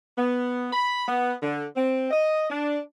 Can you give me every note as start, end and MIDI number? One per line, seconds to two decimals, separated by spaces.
0.18 0.68 59
0.72 1.07 83
1.08 1.33 59
1.43 1.65 50
1.76 2.09 60
2.11 2.46 75
2.50 2.79 62